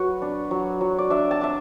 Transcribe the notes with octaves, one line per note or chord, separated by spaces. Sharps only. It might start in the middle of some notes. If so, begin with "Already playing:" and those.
Already playing: F#3 F#4 B4
D4
F#3
F#3
D5
D4 E5
A5
D4 E5